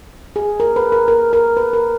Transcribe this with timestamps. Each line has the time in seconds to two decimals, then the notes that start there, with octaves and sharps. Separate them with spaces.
0.36 G#4
0.60 A#4
0.76 B4
0.92 A#4
1.08 A#4
1.33 A#4
1.57 B4
1.73 A#4